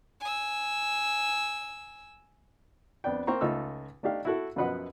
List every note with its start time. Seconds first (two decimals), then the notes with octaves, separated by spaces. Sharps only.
0.20 G#5 E6
3.04 F2 B3 D4 G5
3.27 A#3 C4 C5 A#5 C#6
3.41 C#2 A3 D#4 F4 E6
4.03 A3 D4 D#4 G4 F5
4.25 E4 F#4 A4
4.56 F#2 B2 F3 B4 D#5 F#5